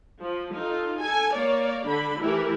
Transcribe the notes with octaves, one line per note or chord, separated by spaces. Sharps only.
F3
D#4 F4 A4
A4 G#5
A#3 C#5 D5
D3 D4 B5
E3 A3 E4 G4 A#4